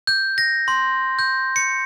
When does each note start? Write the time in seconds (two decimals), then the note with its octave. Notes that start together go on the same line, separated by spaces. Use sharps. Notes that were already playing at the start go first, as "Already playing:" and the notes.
0.07 G6
0.38 A#6
0.68 C6
1.19 G6
1.56 C#7